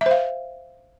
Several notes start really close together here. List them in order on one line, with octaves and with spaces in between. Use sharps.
E5 C5 F5